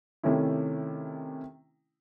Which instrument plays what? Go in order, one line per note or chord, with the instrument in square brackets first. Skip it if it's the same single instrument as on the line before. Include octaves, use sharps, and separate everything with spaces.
[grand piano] C3 D#3 A3 C#4 E4